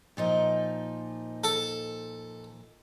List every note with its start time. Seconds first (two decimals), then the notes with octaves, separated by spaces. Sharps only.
0.17 A#2 F3 D#4
1.44 A4